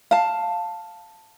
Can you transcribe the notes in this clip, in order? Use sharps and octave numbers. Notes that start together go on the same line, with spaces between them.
F5 A5